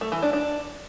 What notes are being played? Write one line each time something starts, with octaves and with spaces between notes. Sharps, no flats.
A3
E3
D4
D4